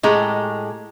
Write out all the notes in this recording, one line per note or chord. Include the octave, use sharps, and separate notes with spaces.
A2 G#3 G4 A#5